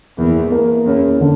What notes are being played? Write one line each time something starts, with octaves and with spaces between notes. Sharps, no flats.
E2 A#3
A#3
E2 C#4
D3